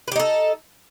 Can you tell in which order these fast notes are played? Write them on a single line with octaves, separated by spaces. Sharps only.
B4 G4 D#4 A4